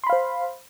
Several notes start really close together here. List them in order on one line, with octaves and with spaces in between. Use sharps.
C6 B5 F5 C5